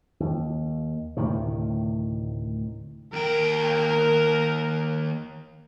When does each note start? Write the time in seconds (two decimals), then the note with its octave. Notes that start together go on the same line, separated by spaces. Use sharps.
0.20 D#2
1.17 D2 A2 C3 D#3
3.13 D#2 A#4 G5